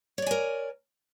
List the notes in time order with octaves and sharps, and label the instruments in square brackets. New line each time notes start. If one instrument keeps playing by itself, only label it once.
[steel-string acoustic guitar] C#5
D5
G#5
A#4